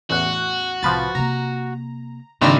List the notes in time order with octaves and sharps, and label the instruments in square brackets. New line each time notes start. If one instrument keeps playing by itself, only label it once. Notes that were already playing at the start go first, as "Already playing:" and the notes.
[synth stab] A1 E2 F#5 [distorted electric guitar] F#4
[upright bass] C2 A2 [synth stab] F3 B4 A6
[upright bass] C3 A#3 [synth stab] A#5
[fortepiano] G#1 D4 [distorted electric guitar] A#2 [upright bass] C#3 [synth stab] A#5 E6 F6